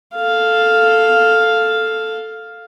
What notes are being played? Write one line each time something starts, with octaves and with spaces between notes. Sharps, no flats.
A4 F5